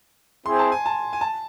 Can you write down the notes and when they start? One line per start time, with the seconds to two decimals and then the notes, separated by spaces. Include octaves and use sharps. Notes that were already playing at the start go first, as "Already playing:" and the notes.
0.46 C4 E4 G#4 C5 C6
0.59 A5
0.72 G#5
0.86 A5
1.13 G#5
1.21 A5